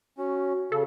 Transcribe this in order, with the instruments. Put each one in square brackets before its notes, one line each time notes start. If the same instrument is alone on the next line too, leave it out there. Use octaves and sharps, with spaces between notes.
[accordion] C#4 [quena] F#4
[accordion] C#3 [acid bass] A4